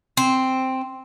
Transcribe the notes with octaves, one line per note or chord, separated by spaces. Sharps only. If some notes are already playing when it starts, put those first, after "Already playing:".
C4